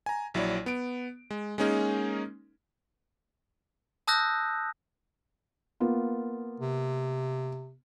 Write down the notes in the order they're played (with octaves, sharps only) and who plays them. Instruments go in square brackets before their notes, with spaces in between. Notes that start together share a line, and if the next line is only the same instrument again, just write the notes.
[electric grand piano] G#5 A#5
A#1 F#3 E4 C#5 D5
B3 D7
G#3
G#3 A#3 C#4 D#4 G#4 A#4
[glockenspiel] A5 D#6 E6 F#6 G6 A#6
[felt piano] A#3 B3 F4
[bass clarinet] C3